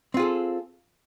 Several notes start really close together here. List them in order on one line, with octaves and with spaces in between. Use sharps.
C4 F4 G#4 A4